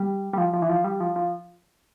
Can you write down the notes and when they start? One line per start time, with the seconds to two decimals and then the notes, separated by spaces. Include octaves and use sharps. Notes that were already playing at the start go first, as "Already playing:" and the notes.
Already playing: G3
0.33 G3
0.38 F3
0.53 F3
0.62 E3
0.69 F3
0.84 G3
1.00 F3
1.16 F3